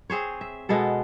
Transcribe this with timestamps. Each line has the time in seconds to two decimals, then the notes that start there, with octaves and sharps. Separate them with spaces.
0.10 C4 G#4 C5 C#5
0.41 E5
0.69 B2 G#3 B3 A4